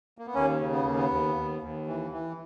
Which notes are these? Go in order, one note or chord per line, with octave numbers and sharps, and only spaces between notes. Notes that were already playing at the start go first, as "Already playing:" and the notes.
A#3
B3
D#2 A#3 C#4
C#3
B3
D#2 A#3
B3
D#2
D#2
D#2
E3
E3